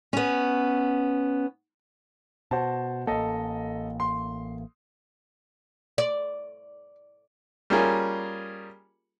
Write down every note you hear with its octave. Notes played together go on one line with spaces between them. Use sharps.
B3 C#4
B2 F#4 C5 A5
A1 A#3 A4 D#5
C6
D5
G3 A#3 C#4 F4 G#4 A#4